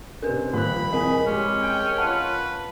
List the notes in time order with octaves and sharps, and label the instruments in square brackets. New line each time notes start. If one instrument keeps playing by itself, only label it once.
[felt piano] C3 C#4 [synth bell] A#4 B4
[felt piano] D#1 F3 F#6 [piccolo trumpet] B5
[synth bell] C4 A#4 D#5 [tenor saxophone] G#4
[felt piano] G#3 G4 [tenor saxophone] C#4
[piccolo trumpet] G5
[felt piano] F4 F#5 [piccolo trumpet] B4 [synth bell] A5